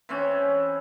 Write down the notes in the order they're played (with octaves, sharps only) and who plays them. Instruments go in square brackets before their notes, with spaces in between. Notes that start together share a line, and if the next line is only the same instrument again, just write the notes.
[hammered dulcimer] E3 C4 C#4